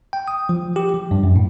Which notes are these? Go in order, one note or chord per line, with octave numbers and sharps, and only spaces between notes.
G5
D#6
F3
G4
F3
G2
F#2
A2